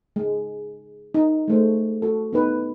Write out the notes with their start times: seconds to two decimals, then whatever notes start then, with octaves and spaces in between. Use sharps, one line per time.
0.16 G#3
1.14 D#4
1.48 G#3 A3 C5
2.02 F#4 A4
2.33 B3 D#4 B4